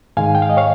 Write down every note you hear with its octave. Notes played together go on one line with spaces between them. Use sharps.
G#2 D#3 G#3 F5 G#5
G5
F5
D#5
C#5 F5